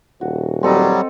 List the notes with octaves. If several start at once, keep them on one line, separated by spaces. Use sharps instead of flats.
D#1 F#4
F#3 G3 C4 A4 D#5